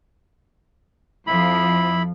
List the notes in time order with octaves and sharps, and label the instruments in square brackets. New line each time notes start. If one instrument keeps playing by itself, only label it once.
[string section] F2 F3 [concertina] E4 B5